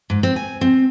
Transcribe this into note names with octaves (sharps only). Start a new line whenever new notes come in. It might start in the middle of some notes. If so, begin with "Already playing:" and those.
G#2
C4
G#5
C4